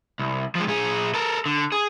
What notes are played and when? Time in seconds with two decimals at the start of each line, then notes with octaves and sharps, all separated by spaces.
0.19 C2
0.55 F3 G#3
0.67 A#2 G#4
1.14 A4 A#4
1.46 D3
1.72 G#4